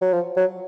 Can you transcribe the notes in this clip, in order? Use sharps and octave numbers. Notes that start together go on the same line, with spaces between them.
F#3
F3
F#3